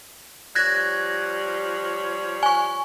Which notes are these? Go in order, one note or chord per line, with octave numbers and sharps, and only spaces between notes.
F3 G3 C#5 F#6 G#6 A#6
G#5 C#6